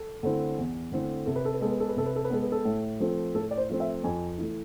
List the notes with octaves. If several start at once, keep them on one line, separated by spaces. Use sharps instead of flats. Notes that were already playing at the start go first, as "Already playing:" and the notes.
Already playing: A4
D3 A3 C4 E4
E2
D3 A3 C4 E4
C3 A4
B4
A4
B4
G#3 B3 A4
B4
A4
B4
C3 A4
B4
A4
B4
G#3 B3 A4
B4
A4
A2
F3 A3 C4
A2 A4
D5
C5
F3 A3 C4
E5
F2 G#5
E3 A3